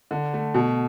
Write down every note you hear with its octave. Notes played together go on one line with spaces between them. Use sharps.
D3
A3
B2